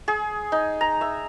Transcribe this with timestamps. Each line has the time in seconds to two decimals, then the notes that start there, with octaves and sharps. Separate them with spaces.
0.08 G#4
0.52 D#4
0.81 A#5
1.01 E5